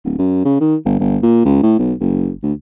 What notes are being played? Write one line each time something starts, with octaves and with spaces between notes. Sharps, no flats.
D1
F#2
C#3
D#3
G1
G1
A#2
C#2
A2
B1
F#1
D2